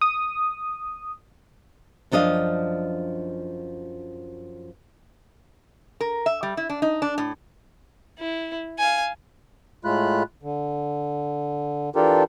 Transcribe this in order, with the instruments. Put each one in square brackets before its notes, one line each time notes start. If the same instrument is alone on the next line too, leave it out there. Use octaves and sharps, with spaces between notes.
[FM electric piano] D#6
[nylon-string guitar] F#2 F3 D4 D#5 F5
[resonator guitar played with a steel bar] A#4
E5
G3
E4
D4
D#4
D4
A2
[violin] E4
F5 G#5
[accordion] A2 G#3 A3 F4 B5 F#6
D3
E3 D4 F4 G4 A4 A#4